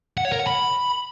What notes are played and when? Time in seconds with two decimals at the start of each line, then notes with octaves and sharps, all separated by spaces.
0.18 F#5
0.25 C#5
0.32 A#4
0.39 F#5
0.47 B5